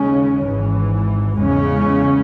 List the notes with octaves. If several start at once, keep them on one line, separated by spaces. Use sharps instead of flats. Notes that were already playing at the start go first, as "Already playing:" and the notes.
Already playing: D#2 C#3 G#3 C#4
G#1 G#2 E3
E2 C#3 G#3 C#4